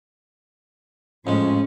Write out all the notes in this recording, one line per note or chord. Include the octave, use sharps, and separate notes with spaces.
F2 A2 F3 G#3 C#4